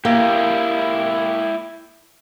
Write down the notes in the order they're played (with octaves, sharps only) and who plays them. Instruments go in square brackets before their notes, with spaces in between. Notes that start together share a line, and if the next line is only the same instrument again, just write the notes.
[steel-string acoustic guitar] A#3 [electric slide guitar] E4 G4